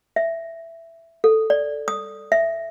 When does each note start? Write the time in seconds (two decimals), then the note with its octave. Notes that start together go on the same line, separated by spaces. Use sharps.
0.16 E5
1.24 A4
1.50 D5
1.88 D#6
2.32 E5